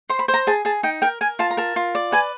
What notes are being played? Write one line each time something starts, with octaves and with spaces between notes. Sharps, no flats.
C5 C6
B5
C5
A#5
G#4 A5
G#4 A5
D#4 G5
A#4 G5
A#4 G#5
F4 A5
A#5
A#4 A5
F4
D5
B4 G#5